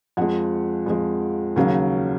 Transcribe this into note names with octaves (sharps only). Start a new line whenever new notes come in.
F2 F3 G#3 F#5
F2 F3 G#3
D#2 C#3 F#3